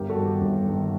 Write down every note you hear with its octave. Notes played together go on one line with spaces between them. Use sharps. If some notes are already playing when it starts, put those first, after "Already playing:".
Already playing: G1 G4 A#4
F#4 A4
G2 D#3
G4
G1 G4
G2 D#3